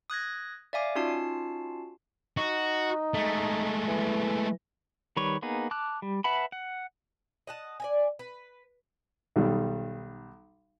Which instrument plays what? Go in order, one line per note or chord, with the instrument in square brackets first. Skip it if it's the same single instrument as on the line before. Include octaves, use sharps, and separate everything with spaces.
[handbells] D#6 F#6 G#6 A#6
D5 E5 F5 G#5 D6
C#4 D#4 F4 F#4 A5 C7
[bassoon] D#4 [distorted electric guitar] F#4
[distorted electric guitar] G#3 A3
[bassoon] E3
[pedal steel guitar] D#3 G3 B4 C#5
A#3 B3 D#4 G#4
A5 D6 F6 F#6
G3
B4 E5 F#5 A5 B5
F#5
[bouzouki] D#5 F#5 A5
D5 D#5 G#5
B4
[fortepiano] B1 D#3 G3